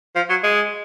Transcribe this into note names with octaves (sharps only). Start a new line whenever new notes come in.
F3
F#3
G#3